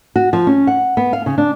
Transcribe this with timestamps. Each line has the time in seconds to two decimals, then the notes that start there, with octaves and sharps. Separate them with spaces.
0.16 F#4
0.33 F3
0.47 C#4
0.67 F#5
0.97 B3
1.13 F5
1.26 C#3
1.38 D4